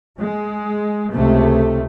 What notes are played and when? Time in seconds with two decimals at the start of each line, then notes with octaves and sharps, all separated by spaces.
0.19 G#3
1.11 C#2 C3 A3